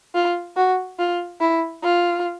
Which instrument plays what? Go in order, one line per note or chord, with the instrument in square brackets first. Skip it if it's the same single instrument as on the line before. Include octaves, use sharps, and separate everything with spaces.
[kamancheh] F4
F#4
F4
E4
F4